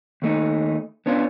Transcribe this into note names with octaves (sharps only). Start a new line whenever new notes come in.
D#2 A3 D#4
B3 C#4 D4 F4